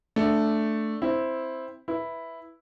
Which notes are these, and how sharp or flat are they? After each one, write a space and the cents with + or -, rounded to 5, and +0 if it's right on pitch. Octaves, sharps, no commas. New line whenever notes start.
A3 +0 D4 +0
C4 +0 E4 -5
E4 +0 B4 +0